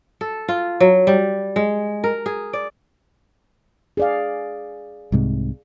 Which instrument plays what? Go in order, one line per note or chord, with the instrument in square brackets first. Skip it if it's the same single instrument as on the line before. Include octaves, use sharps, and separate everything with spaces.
[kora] A4
F4
F#3
G3
G#3
A#4
G#4
D5
[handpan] G#4 D5 F5
[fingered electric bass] C2 G#2 C3